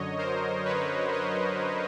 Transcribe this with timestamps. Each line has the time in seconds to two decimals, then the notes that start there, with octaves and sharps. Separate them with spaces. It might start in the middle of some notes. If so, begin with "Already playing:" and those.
Already playing: F#2 D3 F#3 C#5 D#5
0.18 A#4 C5
0.65 B4 C#5
1.12 C#5 D#5